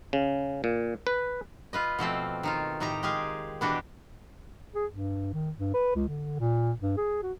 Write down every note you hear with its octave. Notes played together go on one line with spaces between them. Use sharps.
C#3
A#2
B4
F4 B4 D#5
B2 F3 A3 C4
D#3 D#4 F4
A2 D#3 D#4 G4 A#5
G#3 G4 G#4 F5
B2 E3 D4 F#4 G4
G#4
G2
D#3
G2
B4
C#2
D3
A#2
G2
G#4
F#4